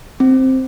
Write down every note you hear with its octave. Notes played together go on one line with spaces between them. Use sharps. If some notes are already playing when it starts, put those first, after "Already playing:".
C4